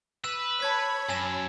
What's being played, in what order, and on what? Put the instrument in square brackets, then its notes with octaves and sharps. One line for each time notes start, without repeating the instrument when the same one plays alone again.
[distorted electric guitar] B4 [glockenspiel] E6 E7
[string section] C#5 B5 [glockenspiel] A5 G#6 B6
[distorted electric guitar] F#2 [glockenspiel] G#5 E7